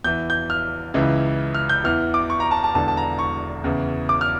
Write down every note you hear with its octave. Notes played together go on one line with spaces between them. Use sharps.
E2 E3 G6
G6
F6
C#2 C#3 E3
F6
G6
E2 E3 F6
D6
C#6
A#5
A5
A5
E1 E2 D3 A5
A5
A#5
C#6
E2 C#3 E3
D6
F6